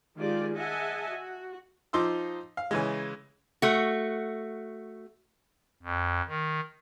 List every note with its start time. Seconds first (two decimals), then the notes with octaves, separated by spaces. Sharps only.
0.17 D#3 G#3 F4 G4 G#4 D5
0.54 G#4 D#5 E5 F#5 G#5 A5
1.11 F#4
1.93 F3 D#4 C6 D6 E6
2.57 F5
2.71 C#3 E3 G#3
3.62 A3 F#4
5.83 F2
6.28 D#3